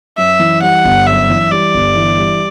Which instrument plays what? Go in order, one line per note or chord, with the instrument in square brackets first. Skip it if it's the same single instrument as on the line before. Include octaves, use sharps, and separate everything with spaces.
[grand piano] F#2 [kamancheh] E5
[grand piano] E3
[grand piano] G3 [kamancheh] F#5
[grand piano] G1
[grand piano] F#2 [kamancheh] E5
[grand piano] E3
[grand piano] G3 [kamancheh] D5
[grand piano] G1
E3
G3